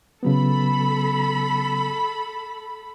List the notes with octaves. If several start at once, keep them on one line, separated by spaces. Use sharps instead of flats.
C#3 F#3 B3 A4 B5